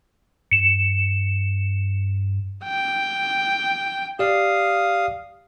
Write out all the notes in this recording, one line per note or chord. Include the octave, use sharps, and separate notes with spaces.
G2 C#7 E7
G5
G4 D5 F5 D#6